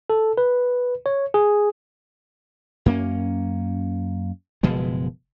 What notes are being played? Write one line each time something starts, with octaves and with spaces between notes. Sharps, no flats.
A4
B4
C#5
G#4
F#2 A#3 C#4
F#1 B2 F3 G#3